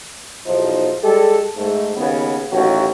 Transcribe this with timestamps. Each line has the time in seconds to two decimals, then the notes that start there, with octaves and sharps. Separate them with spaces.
0.46 B1 E2 F3 D#4 C5
1.04 G3 G#3 G4 A4
1.56 G#2 A3
1.96 D#2 C#3 B3
2.52 A1 D#2 F#3 F#4